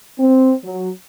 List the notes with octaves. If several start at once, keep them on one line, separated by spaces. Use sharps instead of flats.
C4
F#3